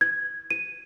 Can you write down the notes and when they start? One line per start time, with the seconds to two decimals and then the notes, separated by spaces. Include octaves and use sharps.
0.01 G#6
0.51 D#7